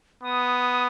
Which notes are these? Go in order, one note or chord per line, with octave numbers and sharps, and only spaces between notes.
B3 D#6